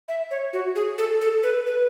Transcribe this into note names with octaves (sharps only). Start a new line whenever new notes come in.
E5
C#5
F#4
G#4
A4
A4
B4
B4